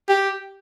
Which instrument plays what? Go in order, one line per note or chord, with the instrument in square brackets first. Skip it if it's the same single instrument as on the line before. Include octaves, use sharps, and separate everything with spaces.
[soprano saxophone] G4